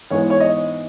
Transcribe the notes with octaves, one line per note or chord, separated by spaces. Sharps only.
G#2 E3 G#3 B3 C#5
C#5
D#5